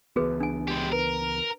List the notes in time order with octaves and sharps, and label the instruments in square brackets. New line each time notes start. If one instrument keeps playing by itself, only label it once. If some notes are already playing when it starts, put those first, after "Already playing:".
[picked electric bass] C#2 E3 B3 [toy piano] F#4 G#4 B4
[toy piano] D4 G#5
[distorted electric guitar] G#3 G4
[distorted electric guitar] A#4 [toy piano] B4